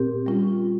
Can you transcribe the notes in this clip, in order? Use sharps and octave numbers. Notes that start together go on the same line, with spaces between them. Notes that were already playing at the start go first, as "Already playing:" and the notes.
Already playing: A#2 C4 G4 A#4
G3 C#4 F4